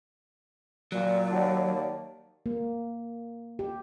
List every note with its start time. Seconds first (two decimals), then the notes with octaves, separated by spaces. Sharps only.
0.92 A#2 F#3 D5
1.31 D#2 C#5 F#5 A5
2.46 A#3
3.59 G4